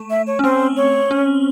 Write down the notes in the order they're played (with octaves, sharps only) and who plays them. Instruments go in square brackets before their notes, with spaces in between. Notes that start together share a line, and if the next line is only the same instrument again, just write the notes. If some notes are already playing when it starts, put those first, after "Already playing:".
Already playing: [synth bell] A3
[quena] E5
C#5
[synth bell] C#4
[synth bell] C4 [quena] C5
[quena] C#5
[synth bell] C#4